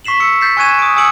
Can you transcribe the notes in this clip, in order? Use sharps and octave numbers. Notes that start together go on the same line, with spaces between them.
C#6 B6 C7 E7 F#7
E6 C#7
G6 A6 B6 C7 E7
G#5 C#6 F#6 G#6 D#7 E7
D#6 D7
G#5 D#6 E6 C#7 D7 F#7